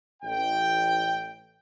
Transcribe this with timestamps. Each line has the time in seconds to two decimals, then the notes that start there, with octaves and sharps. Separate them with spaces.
0.23 A1 G5